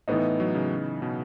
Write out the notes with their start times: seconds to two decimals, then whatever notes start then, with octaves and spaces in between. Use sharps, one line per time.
0.08 A2 E3 B3 D#4
0.40 F#3
0.55 C#3
1.02 B2